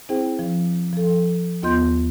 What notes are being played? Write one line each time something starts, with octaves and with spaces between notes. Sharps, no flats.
C4 E4 G#4 C5 G5
F3
F3 A4
D#2 B3 F4 D#5 C6 G6